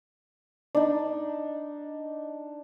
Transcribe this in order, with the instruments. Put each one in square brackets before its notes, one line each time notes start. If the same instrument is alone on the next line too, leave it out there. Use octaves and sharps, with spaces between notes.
[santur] D4 D#4